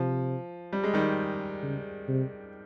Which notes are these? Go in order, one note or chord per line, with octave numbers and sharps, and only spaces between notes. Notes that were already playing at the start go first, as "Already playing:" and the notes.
Already playing: C3 F3
G3
G#3
D#3 G3
C#3
C3